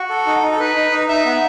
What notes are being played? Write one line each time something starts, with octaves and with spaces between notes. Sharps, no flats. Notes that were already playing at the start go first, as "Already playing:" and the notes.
Already playing: F#4
A4
D#4
D#4
A4
D#4 B4
D#4
D#4
D#4 E5
B3